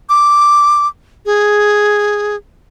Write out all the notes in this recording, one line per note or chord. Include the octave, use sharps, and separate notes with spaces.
D6
G#4